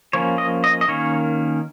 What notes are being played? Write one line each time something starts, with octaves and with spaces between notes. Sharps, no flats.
F3 A#3 C#4 C#5
D#5
D#5
D#5
D#3 A#3 C#4 C#5